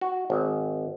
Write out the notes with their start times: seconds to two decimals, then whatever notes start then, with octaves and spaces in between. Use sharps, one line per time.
0.01 F#4
0.30 G#1